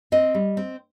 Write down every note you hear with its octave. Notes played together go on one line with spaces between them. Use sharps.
C4 D#5
G3
C4